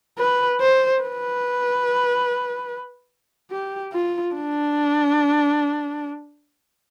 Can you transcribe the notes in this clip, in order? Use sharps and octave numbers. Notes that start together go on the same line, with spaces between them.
B4
C5
B4
G4
F4
D4